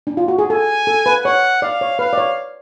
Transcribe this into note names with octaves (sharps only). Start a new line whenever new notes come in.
D4
F4
F#4
G#4
A4 G#5
A4
B4
C#5 F#5
D5 F5
C#5
B4 F5
D5
C#5